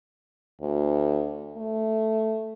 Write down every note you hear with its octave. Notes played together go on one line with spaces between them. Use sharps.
D2
A3